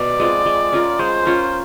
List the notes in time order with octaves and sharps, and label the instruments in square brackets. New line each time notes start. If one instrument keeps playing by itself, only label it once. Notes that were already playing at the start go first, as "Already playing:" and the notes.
Already playing: [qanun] B2 [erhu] D5
[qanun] G#3 C4 F4
G#3
C#4 F4 A#4
[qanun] G#3 [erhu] C5
[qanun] C#4 F4 A#4